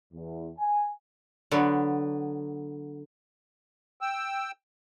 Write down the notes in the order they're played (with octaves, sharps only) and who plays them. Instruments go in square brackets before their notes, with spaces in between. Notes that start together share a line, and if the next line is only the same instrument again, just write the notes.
[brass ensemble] E2
G#5
[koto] D3 F#3 B3
[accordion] G5 E6